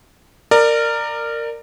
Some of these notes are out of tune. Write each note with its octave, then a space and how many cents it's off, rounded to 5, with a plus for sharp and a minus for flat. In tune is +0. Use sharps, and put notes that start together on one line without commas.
A#4 -15 D5 +20